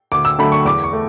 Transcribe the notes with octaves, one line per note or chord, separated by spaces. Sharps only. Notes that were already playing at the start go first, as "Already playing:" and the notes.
D2 D6
E6
D3 F#3 A3 B5
C#6
E2 D6
C#6
A3